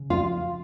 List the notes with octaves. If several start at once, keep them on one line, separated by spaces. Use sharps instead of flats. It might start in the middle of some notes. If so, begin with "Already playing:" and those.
Already playing: C#3
F3 F4